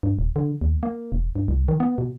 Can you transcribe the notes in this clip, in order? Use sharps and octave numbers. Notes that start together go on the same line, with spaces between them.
G2
D#1
D3
D#2
A#3
E1
G2
C2
D#3
B3
B2